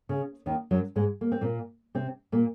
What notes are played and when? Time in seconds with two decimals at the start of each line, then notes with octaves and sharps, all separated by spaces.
0.09 C#3
0.46 D#2 D#3
0.71 F#2 F#3
0.96 G#2 G#3
1.21 A#3
1.32 C4
1.41 A#2 A#3
1.95 C3 C4
2.32 A#2 A#3